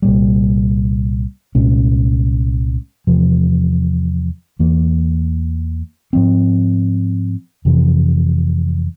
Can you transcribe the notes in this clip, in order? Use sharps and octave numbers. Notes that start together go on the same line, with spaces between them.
C2 A#2 G3
C2 A#2 G#3 C#4
E2 C3 F3
E2 E3 A#3
G#2 F3 C4
F2 C3 E3